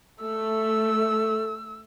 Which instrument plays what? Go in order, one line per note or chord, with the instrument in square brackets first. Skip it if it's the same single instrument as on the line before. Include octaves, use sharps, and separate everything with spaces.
[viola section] A3 [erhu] E6